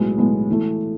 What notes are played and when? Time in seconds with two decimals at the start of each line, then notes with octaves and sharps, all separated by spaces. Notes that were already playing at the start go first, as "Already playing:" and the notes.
Already playing: B1 A2 G#3 B3
0.18 B1 A2 G#3 B3
0.50 E3 A3